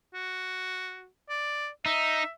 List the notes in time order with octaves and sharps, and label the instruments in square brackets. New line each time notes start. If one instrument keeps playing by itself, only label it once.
[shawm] F#4
D5
[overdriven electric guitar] D#4 [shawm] E5